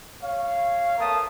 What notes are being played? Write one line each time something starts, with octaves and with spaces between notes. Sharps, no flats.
C#5 F5
A3 B3 A#4 F5 A5 D#6